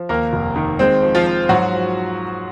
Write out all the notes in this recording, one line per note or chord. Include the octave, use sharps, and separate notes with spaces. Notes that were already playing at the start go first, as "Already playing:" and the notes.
Already playing: F3
D#2 A#3 A#4
F1
D#3
G#3 C4 C5
F3
F3 F4
F3
G#2 F#3 F#4
F3